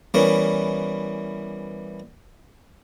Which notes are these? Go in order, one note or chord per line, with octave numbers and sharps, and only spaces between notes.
E3 G3 B3 C#4 A#4